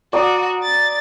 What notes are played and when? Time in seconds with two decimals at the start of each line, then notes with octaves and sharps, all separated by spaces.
0.13 F#4 D5 A#5 D#6
0.63 A6